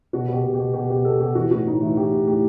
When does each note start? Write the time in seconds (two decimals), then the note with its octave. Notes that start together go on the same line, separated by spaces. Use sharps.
0.13 B2 F#4
0.29 B2 G4
0.44 B2
0.54 B2 G4
0.74 B2 G4
0.90 B2 G4
1.05 B2 A4
1.20 B2 G4
1.35 E3 F#4
1.51 A2 F#4
1.66 A2 D#4
1.81 E3 E4
1.97 E3 G4
2.12 A2
2.27 A2 G4